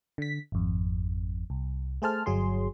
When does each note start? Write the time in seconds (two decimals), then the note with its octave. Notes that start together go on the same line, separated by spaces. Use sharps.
0.18 D3 B6
0.52 G#1 F2
1.50 C2
2.02 A3 G#4 C5 A5 F6
2.26 G1 F#3 G#4 C6